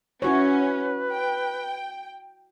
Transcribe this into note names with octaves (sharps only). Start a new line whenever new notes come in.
C#4 E4 F#4 B4 C#5
G5